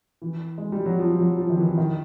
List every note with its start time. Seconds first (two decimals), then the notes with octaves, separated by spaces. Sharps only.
0.22 E3
0.58 G#3
0.72 G3
0.86 F#3
0.99 F3
1.19 F#3
1.38 F3
1.50 D#3
1.58 E3
1.78 D#3